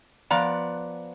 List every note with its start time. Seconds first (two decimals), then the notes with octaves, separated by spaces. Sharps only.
0.31 F3 B3 D5 A#5